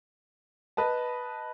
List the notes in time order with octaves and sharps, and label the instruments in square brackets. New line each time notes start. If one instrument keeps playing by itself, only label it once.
[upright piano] B4 D#5 A5